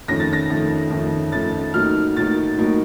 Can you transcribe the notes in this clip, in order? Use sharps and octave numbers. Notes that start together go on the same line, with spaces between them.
F2 D#3 A3 C#4 F4 A#6
A6
A#6
F2 D#3 A3 C#4 F4
F2 D#3 A3 C#4 F4
F2 D#3 A3 C#4 F4 A6
A2 F#3 A#3 D#4 F6
A2 F#3 A#3 D#4 A6
A2 F#3 A#3 D#4